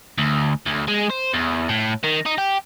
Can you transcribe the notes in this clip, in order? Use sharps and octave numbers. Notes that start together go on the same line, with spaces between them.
D2
D2
G#3
C5
E2
A2
D#3
D#4
G4